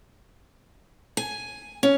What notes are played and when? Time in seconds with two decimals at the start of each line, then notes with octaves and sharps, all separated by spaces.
1.17 G#5
1.83 C#4